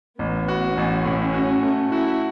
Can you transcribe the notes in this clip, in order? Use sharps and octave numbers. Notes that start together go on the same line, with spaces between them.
A1 B3
F#4
A1 C#4
A2
F#4
A3
E4 F#4